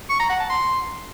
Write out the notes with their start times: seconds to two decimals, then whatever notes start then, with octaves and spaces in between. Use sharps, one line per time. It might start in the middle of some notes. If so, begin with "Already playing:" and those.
0.10 C#6
0.20 A#5
0.30 F#5
0.40 A5
0.50 C6